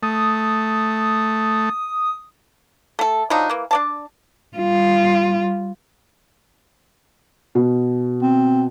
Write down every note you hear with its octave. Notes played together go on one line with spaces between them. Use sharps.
A3 D#6
A3 A4
F3 F#3 D4 D#4
E3 A#3
D4 D5 A5
G3 F4
B2
C4